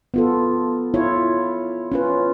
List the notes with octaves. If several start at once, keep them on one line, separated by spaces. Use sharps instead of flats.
B3 F4 A4
E4 F4 C#5
C#4 F4 B4